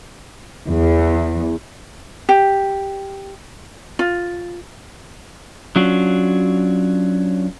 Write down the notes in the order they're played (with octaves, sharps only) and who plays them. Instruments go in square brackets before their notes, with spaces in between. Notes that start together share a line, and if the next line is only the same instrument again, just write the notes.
[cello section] E2
[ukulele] G4
F4
[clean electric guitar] F#3 C#4 D4 F4 F#4